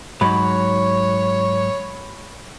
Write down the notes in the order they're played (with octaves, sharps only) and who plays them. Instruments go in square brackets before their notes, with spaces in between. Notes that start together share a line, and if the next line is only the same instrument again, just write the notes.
[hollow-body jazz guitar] G#2 F#3 [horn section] C#5 [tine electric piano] B5